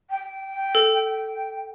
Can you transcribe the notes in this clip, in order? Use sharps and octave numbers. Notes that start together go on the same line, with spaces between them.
G5
A4